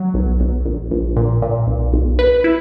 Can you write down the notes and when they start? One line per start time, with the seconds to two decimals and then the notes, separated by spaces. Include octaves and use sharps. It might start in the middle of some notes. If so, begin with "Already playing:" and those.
Already playing: F#3
0.14 B1
0.40 B1
0.65 A#1
0.91 A#1
1.17 A#2
1.42 A#2
1.67 B1
1.93 B1
2.19 B4
2.44 E4